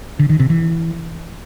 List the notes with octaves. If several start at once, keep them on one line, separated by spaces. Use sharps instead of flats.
D3
D#3
C3
E3